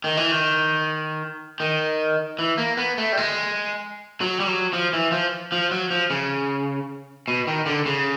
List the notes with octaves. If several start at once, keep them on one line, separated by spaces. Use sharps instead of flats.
D#3
E3
D#3
D#3
E3
A#3
B3
A3
G3
G#3
F#3
G3
F#3
F3
E3
F3
F3
F#3
F3
C#3
B2
D#3
D3
C#3